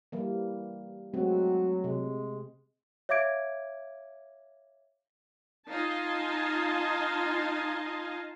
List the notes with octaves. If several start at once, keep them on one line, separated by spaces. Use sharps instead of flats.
E3 G3 A#3
F#3 G#3 A3 C4 F#4
C3 G#3
C#5 E5 F5 D6 G#6 D7
D#4 F4 D#5 F5 G#5 A5